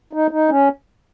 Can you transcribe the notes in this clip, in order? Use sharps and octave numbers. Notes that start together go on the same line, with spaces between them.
D#4
D#4
C#4